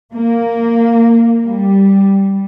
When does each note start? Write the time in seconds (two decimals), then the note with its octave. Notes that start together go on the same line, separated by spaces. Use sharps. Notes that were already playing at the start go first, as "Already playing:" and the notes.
0.14 A#3
1.46 G3